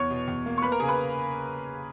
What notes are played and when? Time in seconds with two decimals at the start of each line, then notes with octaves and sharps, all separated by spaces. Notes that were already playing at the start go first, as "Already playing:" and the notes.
Already playing: E2 C#5 C#6
0.10 B2
0.28 E2
0.46 A#3
0.58 C#6
0.62 A#3 B4 B5
0.72 A#4 A#5
0.80 C#3 G#4 G#5
0.88 B4 B5